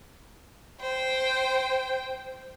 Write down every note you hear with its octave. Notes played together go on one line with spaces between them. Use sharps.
C5 G5